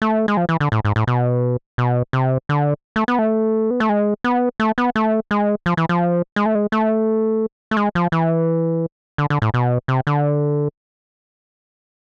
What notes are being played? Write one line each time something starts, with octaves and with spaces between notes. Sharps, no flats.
A3
G#3
F3
E3
D3
A2
G#2
A2
B2
B2
C3
D3
A3
B3
A3
B3
A3
G#3
B3
A3
B3
A3
G#3
F3
E3
F3
G#3
A3
G#3
A3
A3
G#3
F3
E3
D3
D3
A2
B2
C3
D3